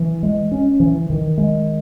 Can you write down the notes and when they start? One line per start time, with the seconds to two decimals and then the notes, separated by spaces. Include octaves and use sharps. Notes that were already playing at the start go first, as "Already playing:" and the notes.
Already playing: E3
0.23 G#3
0.52 C#4
0.80 E3
1.10 D#3
1.38 G#3